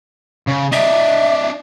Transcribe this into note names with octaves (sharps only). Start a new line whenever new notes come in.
C#3
D4 D#5 E5